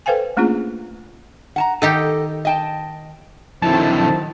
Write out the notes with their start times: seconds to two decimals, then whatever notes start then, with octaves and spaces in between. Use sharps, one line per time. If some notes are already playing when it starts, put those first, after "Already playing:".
0.06 A4 B4 C5 F5 G5 G#5
0.37 A3 A#3 C#4 D4 F4 G#4
1.56 F#5 A5 A#5
1.82 D#3 D#4 G4 A4 D#5
2.45 D#5 G5 A5
3.62 F2 D3 D#3 F#3 C4 E4 A5